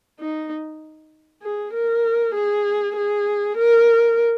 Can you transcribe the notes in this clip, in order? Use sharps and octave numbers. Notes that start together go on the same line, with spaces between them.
D#4
G#4
A#4
G#4
G#4
A#4